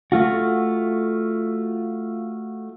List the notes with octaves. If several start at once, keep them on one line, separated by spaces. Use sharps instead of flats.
A3 F4 F#4